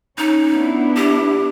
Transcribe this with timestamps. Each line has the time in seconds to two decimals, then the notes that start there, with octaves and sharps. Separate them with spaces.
0.18 C#4 D#4
0.52 B3 D4 E4
0.96 G4